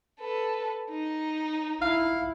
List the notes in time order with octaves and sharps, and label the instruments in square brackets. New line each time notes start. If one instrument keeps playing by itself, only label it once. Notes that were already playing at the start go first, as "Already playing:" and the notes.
[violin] A4 B4
D#4
[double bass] E4 [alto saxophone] F5